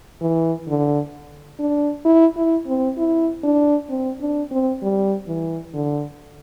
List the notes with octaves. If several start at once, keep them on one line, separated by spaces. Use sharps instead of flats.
E3
D3
D4
E4
E4
C4
E4
D4
C4
D4
C4
G3
E3
D3